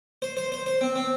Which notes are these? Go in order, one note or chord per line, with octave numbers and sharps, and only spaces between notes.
C5
C5
C5
C5
C4
C4